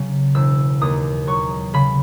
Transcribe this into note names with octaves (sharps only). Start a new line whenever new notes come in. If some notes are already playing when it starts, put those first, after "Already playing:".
Already playing: C#3 F#3
E1 E6
D#2 D#6
F#3 C#6
C#3 B5